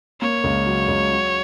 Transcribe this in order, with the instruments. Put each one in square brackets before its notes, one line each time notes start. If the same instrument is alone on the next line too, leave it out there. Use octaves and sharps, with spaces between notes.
[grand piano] A#3 [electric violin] C#5
[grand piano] C#2
F#3
C#2
F#3